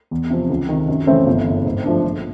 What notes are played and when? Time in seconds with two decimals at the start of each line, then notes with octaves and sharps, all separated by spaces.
0.11 E2
0.30 C3 F3
0.50 C#2
0.69 C3 D#3
0.89 F#2
1.07 C#3 E3 A3 C4
1.27 G1
1.46 F#2 C#3
1.66 G#2
1.85 F3 A3 D4
2.04 A#1